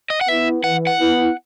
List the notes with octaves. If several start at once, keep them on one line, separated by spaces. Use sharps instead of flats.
D#5
F#5
B3 E4 E5
E3 F#5
F#5
B3 E4